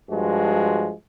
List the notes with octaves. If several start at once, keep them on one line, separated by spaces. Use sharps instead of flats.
G2 F3 G#3 F#4